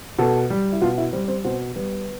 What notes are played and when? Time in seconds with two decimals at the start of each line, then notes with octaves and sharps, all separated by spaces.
0.18 B2 A4
0.50 G3
0.73 E4
0.81 B2 F4
0.98 E4
1.13 G3 C4
1.28 C4
1.44 B2 C4
1.76 G3 B3